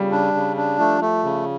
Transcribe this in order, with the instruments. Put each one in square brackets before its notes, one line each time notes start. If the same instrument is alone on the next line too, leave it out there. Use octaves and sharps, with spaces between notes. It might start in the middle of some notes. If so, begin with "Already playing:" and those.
Already playing: [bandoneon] C#3 [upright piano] G3
[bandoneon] D4
C#3
D4
[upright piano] F3 [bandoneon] A3
[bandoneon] A3
C#3